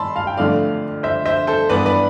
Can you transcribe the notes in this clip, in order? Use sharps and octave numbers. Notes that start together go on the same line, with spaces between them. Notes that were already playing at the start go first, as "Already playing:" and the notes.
Already playing: A5 B5 C6 E6
F5 A5
G5
F2 D3 A3 D4 D5 F5
C5 E5
C5 E5
A4 C5
G2 E3 B3 D4 B4 D5
B4 D5